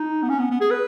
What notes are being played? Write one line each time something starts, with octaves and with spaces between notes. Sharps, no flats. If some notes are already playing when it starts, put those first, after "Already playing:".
Already playing: D#4
B3
C#4
B3
B3
G#4
B4